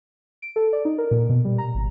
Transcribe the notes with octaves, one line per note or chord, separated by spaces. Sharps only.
D7
A4
D5
D#4
A#4
A#2
B2
G3
A#5
G#1